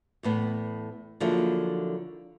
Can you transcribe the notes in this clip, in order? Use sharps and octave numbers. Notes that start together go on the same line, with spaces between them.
E2 A2 B3
D3 F3 F#3 A#3 E4 G#4